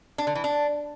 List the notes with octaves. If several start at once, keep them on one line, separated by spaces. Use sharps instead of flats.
D4
D3
E3
D4